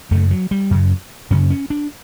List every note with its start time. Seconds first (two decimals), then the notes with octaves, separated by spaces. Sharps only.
0.11 F#2 C#3 A3
0.31 F#3
0.51 G3
0.71 F#2 C#3
1.30 F#2 C#3 C#4
1.50 C#4
1.70 D4